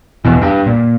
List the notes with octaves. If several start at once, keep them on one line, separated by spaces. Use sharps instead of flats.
E2 B2 E3
G2
A#2